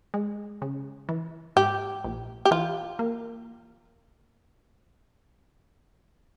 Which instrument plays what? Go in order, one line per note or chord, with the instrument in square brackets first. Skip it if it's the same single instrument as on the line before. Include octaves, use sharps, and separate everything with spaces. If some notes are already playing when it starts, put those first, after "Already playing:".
[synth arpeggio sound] G#3
C#3
E3
[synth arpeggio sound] G#2 [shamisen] G4
[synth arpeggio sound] A#1
[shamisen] G4
[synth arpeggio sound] E3 [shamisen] F4
[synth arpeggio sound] A#3